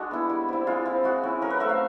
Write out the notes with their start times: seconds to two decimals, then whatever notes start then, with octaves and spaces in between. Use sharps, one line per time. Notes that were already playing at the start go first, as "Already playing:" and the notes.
Already playing: G#3 D4 F#4
0.11 B3 E4
0.29 G3
0.49 C4 E4
0.67 G#3 F4
0.86 C4 E4
1.04 G#3 F#4
1.23 C#4 E4
1.42 F#3 A#4
1.50 B4
1.60 A3 C4 E5
1.69 F5